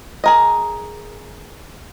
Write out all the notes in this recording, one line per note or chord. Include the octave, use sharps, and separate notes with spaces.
G#4 A#4 D#5